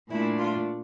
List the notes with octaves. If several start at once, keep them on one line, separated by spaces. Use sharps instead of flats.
A#2 A3 D4 E4
F4